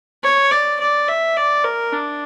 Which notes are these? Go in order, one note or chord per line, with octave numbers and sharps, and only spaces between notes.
C#5
D5
D5
E5
D5
A#4
D4